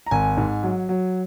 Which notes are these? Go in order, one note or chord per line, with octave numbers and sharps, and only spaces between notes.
A#5
G#1 G#5
G#2
F#3
F#3